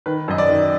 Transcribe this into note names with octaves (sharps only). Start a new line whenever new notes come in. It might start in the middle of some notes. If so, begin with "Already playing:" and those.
D#3 B4
F#2 D#5
D5
D#3